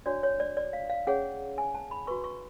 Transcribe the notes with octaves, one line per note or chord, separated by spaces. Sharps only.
D4 F#4 C#5 D5
C#5
D5
D5
F5
F5
C#4 G#4 C#5 F#5
G#5
A5
B5
F#4 B4 C#6
C#6